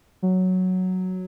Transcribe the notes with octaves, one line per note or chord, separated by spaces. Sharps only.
F#3